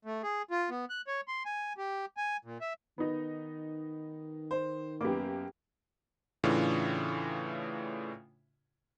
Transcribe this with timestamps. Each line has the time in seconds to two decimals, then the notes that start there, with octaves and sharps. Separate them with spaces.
0.05 A3
0.23 G#4
0.51 F4
0.70 B3
0.90 F#6
1.07 C#5
1.28 C6
1.45 G#5
1.78 G4
2.17 G#5
2.45 A#2
2.61 E5
2.98 D#3 B3 D#4
4.51 C5
5.01 F#2 A#3 B3 G4 D6
6.44 A2 C#3 E3 D4 F4